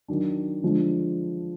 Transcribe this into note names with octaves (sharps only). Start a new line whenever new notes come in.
D#3 F#3 D4
D3 F3 G#3 D4